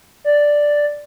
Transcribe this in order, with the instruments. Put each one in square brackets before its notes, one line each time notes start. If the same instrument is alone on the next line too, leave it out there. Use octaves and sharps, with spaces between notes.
[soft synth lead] D5